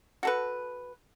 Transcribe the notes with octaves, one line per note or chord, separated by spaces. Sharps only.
F#4 A4 B4